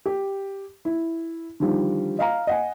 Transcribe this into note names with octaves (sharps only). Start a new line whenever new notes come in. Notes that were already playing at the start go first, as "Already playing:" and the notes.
G4
E4
D3 D#3 F3 G3
D#5 F5 A#5
D#5 F#5 G#5